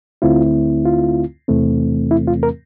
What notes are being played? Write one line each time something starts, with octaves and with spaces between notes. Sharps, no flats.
D2 D3 A3 C4 E4 F4
F4
E2 C3 E3 A3 C4
E4
F4
A#4